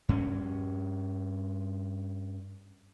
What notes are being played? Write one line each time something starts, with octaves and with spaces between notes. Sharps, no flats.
G2 C#4